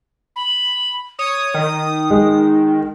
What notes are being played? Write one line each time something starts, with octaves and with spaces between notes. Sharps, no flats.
B5
C#5 D#6
D#3
G#3